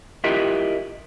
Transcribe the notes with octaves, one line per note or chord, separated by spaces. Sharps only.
E4 F4 G4 A#4 D#5